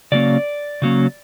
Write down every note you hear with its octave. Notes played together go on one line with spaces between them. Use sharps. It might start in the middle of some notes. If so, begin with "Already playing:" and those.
C#3 F#3 A#3 C#4 D5
C#3 F#3 A#3 C#4